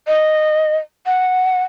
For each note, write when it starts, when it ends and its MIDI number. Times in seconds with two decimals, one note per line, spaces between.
0.07 0.77 75
1.06 1.63 78